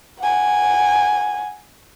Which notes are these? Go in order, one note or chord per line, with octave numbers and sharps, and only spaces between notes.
F#5 G#5